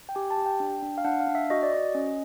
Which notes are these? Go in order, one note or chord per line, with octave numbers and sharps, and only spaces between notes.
G5
G4 G#5
A5
G4
G5
D4
D4
F5
D4 F#5
F5
D4
E5
F#4 D#5
D5
F#4 D#5
C#4